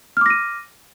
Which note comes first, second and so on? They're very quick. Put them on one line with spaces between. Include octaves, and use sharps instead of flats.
F6 D6 A#6 D#7